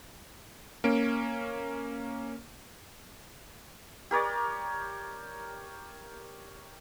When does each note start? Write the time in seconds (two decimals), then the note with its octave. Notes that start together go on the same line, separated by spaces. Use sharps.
0.84 A#3 C#4 D7
4.11 G4 A#4 C#5 D5